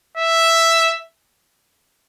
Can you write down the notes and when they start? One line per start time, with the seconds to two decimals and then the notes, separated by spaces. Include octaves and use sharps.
0.17 E5